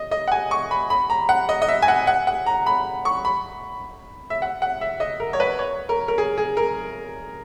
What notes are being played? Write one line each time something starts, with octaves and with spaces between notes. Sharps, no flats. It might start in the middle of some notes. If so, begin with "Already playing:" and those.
Already playing: D#5
D#5
F#5
G#5
C#6
B5
B5
A#5
F#5
D#5
D#5
E5
G#5
F#5
F#5
F#5
A#5
B5
C#6
B5
E5
F#5
F#5
E5
D#5
A#4
C#5
B4
C#5
A#4
A#4
G#4
G#4
A#4